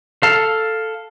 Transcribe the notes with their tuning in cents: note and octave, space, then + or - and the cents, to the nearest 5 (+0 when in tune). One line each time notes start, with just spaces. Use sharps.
A4 +5 F5 +0